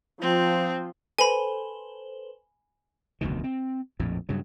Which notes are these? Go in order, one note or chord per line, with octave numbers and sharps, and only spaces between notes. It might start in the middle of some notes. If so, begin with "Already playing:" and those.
F3 C4
A4 B4 C5 G#5 B5
F1 D2 B2 D#3
C4
A#1 F2 A2
G2 C#3 F#3